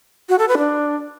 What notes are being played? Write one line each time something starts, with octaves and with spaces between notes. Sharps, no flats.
F#4
A4
B4
D4